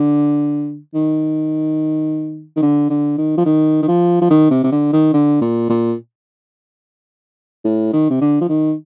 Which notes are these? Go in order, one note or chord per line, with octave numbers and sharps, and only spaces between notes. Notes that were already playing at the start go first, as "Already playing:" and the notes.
Already playing: D3
D#3
D#3
D3
D3
D#3
F3
D#3
D#3
F3
F3
D#3
C3
C3
D3
D#3
D3
A#2
A#2
A2
D#3
C3
D3
F3
D#3